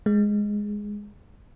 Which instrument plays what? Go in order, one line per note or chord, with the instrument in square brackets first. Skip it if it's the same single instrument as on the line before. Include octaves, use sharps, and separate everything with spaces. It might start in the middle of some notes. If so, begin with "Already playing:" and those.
[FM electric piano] G#3